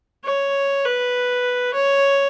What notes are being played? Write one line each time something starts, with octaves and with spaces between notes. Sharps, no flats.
C#5
B4
C#5